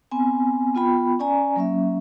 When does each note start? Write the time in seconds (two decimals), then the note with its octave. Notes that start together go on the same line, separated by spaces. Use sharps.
0.11 B3 C4 G#5
0.75 B3 F4 G5 B5
1.19 C#4 D5 G#5 A#5
1.56 F#3 A#3 C#4 E5